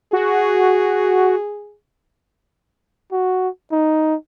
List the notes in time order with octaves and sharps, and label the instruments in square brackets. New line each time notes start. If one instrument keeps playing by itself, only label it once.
[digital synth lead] F#4 [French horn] G#4
[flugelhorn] F#4
D#4